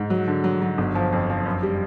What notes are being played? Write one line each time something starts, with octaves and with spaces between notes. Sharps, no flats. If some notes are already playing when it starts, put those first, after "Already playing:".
Already playing: G#2
F#3
D3
F#3
F#3
G1
F3
F2
F3
F#2
G3